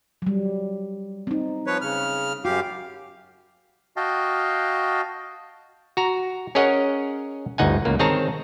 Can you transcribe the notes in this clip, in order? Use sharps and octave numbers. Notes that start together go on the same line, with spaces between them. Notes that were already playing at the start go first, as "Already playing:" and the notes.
F#3 G3
C4 D#4
F3 B4 C#5
C#3 F6
F#2 F#4 G4 F5
F#4 D#5 F5 G5 A5
F#4 A#5
C#4 G#4 A#4 C#5 D#5 F#5
G1 D2 D#4 F#5 G#5
C#2 A#3
D#3 C4 G#4 C#5 A5 A#5